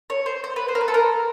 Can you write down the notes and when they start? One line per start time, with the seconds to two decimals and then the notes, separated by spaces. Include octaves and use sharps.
0.10 C#5
0.26 C5
0.44 C5
0.56 B4
0.68 C5
0.75 A#4
0.81 B4
0.88 A4
0.94 A#4